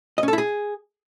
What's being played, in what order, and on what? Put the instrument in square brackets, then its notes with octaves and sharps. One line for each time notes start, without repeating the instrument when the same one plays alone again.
[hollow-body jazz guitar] D#5
C#4
A4
E4
G#4